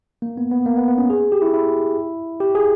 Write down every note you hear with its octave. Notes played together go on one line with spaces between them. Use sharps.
A#3
B3
B3
A#3
B3
B3
C#4
G#4
G4
E4
E4
G4
G#4